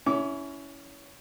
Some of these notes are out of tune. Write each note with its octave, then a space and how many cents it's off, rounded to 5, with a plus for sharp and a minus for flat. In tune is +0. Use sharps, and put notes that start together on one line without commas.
C#4 +20 E4 +0 D6 -30